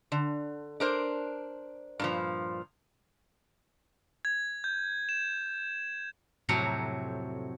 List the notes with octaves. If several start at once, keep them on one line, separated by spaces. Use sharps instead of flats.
D3
D4 A#4 C5
G2 A#2 F3
G#6
G6
E7
F2 A2 C3 F#3 F#4 A#5